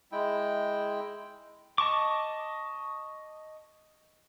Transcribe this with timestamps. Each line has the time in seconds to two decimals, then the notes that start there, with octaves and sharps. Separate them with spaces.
0.12 G#3 E4 G5
1.78 D#5 A5 C#6 D6